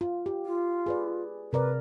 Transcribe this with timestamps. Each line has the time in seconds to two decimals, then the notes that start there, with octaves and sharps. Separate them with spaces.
0.01 F4
0.26 G4
0.46 F4
0.86 G#4 B4 D5
1.53 C3 A#4 B4 D5